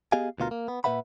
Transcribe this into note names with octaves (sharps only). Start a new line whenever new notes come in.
B3 G4 G#4 D#5 F5 G#5
D2 B2 F4 A#4
A#3
B3
A#2 F#3 B4 E5 F#5 B5